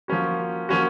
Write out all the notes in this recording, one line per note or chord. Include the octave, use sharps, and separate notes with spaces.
F3 A#3 C#4 F#4
F3 A#3 C#4 F#4